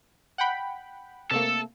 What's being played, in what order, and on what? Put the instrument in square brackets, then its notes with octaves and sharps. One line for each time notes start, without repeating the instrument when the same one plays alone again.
[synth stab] F#5 G5 B5
[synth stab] C3 A3 A#3 [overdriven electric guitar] A4